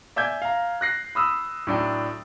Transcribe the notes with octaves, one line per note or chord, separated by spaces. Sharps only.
D5 E5 G#5 G6 G#6
F5 A#5
F#6 A#6 C7
B5 D#6 E6
A2 F#3 D4 E4 G5